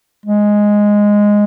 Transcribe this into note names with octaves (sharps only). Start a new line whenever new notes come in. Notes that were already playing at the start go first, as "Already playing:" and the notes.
G#3